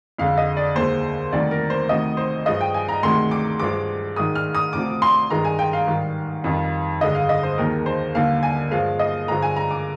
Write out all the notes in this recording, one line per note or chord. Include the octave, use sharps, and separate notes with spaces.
F2 D3 G#3 F5
D#5
D5
D#2 D3 G#3 C5
D2 C3 D#3 G3 D5
A#4
C5
D2 C3 D#3 D#5
C5
G2 F3 G#3 D#5
G5
G#5
A#5
D2 C3 D#3 G#3 C6
D6
G2 F3 G#3 D6
G#2 D#3 G#3 D#6
F6
D#6
D2 C3 F3 D6
C6
G2 D#3 G#3 A#5
G#5
G5
F5
G#2 D#3 G3
F2 D#3 G3
G2 D3 G#3 D#5
F5
D#5
C5
D#2 D#3 G#3 A#4
C5
D#2 D3 G3 F5
G#5
G2 F3 G#3 F5
D#5
G2 D3 F3 G#3 A#5
G#5
A#5
D6